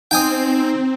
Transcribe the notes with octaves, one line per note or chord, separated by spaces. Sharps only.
C4 D#4 G5 G#5 D#6